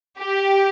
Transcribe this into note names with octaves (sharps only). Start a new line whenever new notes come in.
G4